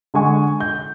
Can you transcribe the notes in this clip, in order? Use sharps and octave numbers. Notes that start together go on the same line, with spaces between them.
D3 G#3 G#5 C#6
G6